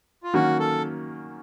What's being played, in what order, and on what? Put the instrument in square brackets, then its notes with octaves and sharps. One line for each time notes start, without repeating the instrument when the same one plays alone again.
[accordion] F4
[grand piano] D#3 F#3 A#3 C#4 [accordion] F#4
[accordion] A4